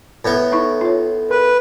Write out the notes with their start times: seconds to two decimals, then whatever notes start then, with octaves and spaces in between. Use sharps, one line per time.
0.25 A2 B3
0.52 D#4 E4 C#6
0.81 F4 C#5
1.31 A#4 B4